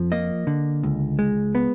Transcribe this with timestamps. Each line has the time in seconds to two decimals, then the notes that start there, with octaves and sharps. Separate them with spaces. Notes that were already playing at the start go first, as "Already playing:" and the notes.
Already playing: F2 F3
0.12 A#3 D#5
0.47 D3
0.83 C#2
1.19 G#3
1.55 B3